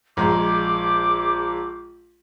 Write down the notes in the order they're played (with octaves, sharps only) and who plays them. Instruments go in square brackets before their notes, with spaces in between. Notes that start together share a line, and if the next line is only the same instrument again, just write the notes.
[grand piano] A#1 G#3 A#5 [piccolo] D6